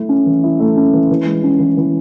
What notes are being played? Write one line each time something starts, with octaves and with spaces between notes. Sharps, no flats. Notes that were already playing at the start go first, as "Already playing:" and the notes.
Already playing: A3 E4
C#4
E3
E4
A3
C#4
E3
E3
G#3
C#4
E3
E3